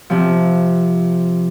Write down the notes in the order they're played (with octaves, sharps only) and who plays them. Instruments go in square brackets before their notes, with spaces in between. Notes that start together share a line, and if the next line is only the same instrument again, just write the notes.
[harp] C3 F3